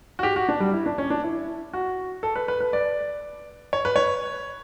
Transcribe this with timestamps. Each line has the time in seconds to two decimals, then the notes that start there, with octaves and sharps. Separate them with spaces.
0.19 F#4
0.23 G4
0.36 F#4
0.49 D4
0.60 G3
0.73 E4
0.86 D4
0.98 C#4
1.10 D4
1.24 E4
1.73 F#4
2.23 A4
2.36 B4
2.48 B4
2.60 B4
2.73 D5
3.73 C#5
3.85 B4
3.96 C#5